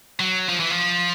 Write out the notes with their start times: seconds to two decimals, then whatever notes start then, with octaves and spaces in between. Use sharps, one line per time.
0.20 F#3
0.49 F3
0.60 E3
0.71 F3